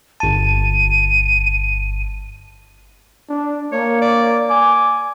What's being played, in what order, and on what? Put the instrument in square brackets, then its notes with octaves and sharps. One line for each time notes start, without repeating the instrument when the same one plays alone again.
[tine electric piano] G1 A5 [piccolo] D#7
[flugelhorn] D4
[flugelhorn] A#3 [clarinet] C#5
[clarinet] D5
[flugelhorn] G#5 [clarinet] D6